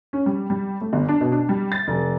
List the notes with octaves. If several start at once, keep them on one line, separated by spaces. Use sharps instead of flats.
C#4
G3
G3
A3
G1
D4
B2
D4
G3
A6
F1